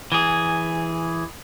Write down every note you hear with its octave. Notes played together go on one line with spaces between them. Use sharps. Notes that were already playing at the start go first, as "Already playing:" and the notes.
E3 G#4